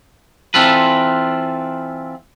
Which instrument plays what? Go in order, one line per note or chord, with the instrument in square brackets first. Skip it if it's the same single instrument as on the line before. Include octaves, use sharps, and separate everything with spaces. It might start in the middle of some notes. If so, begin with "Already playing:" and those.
[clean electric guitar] E3 C4 F4 A4 B4